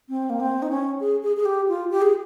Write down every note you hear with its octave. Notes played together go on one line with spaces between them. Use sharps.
C4
A#3
C4
D#4
C#4
G#4
G#4
G#4
G4
F4
G4
G#4